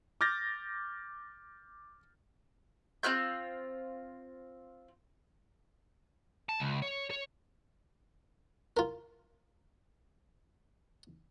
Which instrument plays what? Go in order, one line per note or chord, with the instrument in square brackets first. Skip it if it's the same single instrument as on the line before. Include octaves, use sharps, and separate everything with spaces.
[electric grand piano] D6 F6 G6 A6 A#6
[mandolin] C4 F4 F#6 G6
[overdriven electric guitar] A5
C#2
C#5
C#5
[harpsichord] F4 A#4